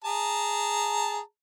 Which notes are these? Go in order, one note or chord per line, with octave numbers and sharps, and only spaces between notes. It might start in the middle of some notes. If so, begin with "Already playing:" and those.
G#4 A5 A#5